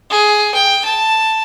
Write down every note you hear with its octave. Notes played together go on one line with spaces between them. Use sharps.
G#4
G5
A5